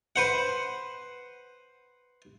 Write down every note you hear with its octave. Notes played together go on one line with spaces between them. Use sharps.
B4 C5 F#5